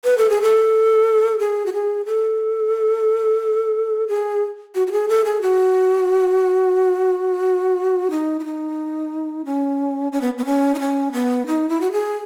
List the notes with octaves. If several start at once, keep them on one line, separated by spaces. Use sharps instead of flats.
B4
A4
G#4
A4
G#4
F#4
G#4
A4
G#4
F#4
F#4
G#4
A4
G#4
F#4
D#4
E4
D#4
C#4
C#4
B3
B3
C#4
D#4
C#4
B3
D#4
E4
F#4
G#4